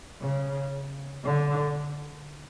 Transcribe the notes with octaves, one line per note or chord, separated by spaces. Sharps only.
C#3
D3